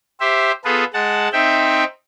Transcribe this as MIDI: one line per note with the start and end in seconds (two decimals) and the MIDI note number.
0.20 0.52 67
0.20 0.52 72
0.20 0.52 76
0.65 0.84 59
0.65 0.84 65
0.65 0.84 68
0.65 0.84 69
0.65 0.84 71
0.94 1.28 56
0.94 1.28 78
0.94 1.28 81
1.32 1.84 60
1.32 1.84 63
1.32 1.84 76
1.32 1.84 79